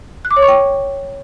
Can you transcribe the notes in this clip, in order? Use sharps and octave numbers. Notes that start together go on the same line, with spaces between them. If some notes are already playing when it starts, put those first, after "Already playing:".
F#6
D6
C#5
C#6
G5